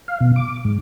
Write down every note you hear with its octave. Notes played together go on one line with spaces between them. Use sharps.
F5
B2
D6
G#2